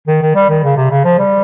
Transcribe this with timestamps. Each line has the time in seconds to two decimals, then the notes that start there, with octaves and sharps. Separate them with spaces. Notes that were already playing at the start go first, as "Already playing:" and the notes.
0.08 D#3
0.22 D#3
0.36 G3
0.50 D#3
0.63 C#3
0.77 C3
0.91 C#3
1.05 F3
1.19 G3